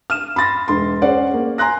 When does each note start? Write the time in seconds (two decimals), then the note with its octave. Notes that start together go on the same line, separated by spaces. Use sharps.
0.10 F6 E7
0.36 B5 C6 A6 A#6
0.68 E1 C6
1.02 C#4 G#4 C5 D5 F#5
1.34 A#3
1.58 G#5 A#5 C6 F#6 A#6